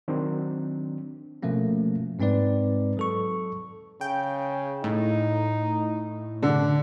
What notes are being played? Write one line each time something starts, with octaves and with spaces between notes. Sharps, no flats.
D#3 F#3 C4 D4
B2 F3 A3 A#3 C#4
G#2 G#3 C4 D#4 B4 D5
F#3 A4 C#6
C#3 G5
A2 D#4
D3 D4